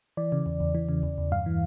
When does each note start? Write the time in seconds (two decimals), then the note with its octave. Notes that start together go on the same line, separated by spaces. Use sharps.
0.17 E3 D5
0.32 C#3
0.46 E2
0.60 E2
0.75 E3
0.89 C#3
1.03 E2
1.18 E2
1.32 G2 F5
1.46 E3